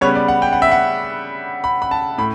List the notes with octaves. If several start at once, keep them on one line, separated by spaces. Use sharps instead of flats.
C#3 G3 B3 C#5
D5
F#5
G5
F#5
E5
F#5
B5
B5
A5
A2 B5